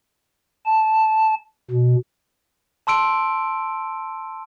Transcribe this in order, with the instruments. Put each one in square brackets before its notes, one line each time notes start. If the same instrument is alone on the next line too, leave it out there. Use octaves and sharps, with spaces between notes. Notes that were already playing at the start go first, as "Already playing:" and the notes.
[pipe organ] A5
B2
[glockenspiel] A5 C6 E6 D7